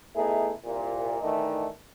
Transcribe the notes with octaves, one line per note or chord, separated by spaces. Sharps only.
A3 B3 D#4 E4 G#4
C2 A#2
D#3 E3 A3 D4 D#4